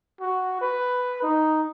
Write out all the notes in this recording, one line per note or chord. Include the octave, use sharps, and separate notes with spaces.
F#4
B4
D#4